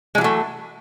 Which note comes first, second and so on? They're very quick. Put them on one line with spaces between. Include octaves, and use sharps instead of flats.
G#3 E3 F#3 A3